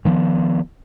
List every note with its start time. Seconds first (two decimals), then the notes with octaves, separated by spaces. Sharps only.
0.05 D#3 F3 A3 B3